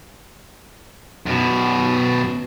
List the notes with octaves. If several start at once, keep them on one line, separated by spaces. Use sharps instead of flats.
F#2 B2